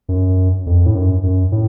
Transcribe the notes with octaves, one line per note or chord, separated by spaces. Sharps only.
F#2
F2
A2
F#2
F#2
A2